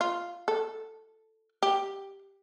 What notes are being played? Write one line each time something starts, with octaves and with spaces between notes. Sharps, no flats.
F4
A4
G4